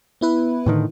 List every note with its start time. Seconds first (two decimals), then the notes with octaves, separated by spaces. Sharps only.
0.21 B3 E4 B4
0.66 A2 D3 D#3